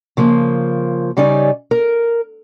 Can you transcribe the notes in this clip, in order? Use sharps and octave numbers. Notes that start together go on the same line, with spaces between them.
C#3 F3 A#3
C#3 G3 C#4 D#4 D5 G#5
A#4